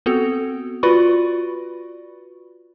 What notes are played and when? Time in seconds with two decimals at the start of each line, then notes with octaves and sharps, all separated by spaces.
0.06 B3 C4 F#4 A4
0.83 F4 F#4 B4 D5 B5 C#6